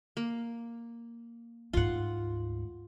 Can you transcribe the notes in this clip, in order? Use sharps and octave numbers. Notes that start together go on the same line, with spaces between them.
A#3
D2 G#2 F4 F#5